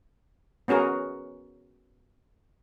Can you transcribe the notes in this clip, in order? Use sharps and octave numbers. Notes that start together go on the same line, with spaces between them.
B3 C#4 F#4 G#4 A#4